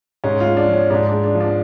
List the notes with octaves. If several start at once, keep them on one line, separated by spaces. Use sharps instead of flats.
G#2 C#4
F4
G#3
D4
F3
C#4
G#2 D4
D4
G#3
D4
F3
D4